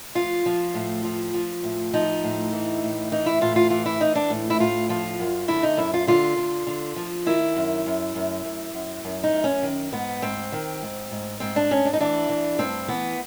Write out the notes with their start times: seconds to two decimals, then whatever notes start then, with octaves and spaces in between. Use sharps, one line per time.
0.15 F3 F4
0.46 F3
0.74 A2
1.04 F3
1.34 F3
1.63 A2
1.93 F3 D#4
2.23 A2
2.53 E3
2.83 A2
3.11 E3 D#4
3.26 E4
3.41 A2 F4
3.56 F4
3.70 E3 F4
3.86 E4
4.00 E3 D#4
4.15 D4
4.30 A2
4.50 E4
4.60 A2 F4
4.89 F3 F4
5.19 F#2
5.48 D3 E4
5.63 D#4
5.77 F#2 E4
5.94 F4
6.07 D3 F4
6.37 D3
6.67 D3
6.96 F3
7.26 D#3 E4
7.56 F#2
7.86 F#2
8.15 F#2
8.45 F#2
8.74 F#2
9.04 F#2
9.23 D#4
9.33 F#2
9.44 C#4
9.63 D#3
9.92 G#2 B3
10.22 G#2 C4
10.52 D#3
10.82 G#2
11.11 G#2
11.40 G#2 C4
11.56 D4
11.71 G#2 C#4
11.85 D4
11.93 D#4
12.00 E3 D4
12.29 E3
12.59 G2 C4
12.88 E3 B3